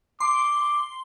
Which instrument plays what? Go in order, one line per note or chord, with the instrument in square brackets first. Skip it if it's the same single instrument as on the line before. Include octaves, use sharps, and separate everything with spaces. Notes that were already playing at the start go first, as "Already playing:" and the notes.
[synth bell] C6 [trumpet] D6